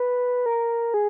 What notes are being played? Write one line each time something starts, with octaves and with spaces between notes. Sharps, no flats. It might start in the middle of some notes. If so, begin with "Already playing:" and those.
Already playing: B4
A#4
G#4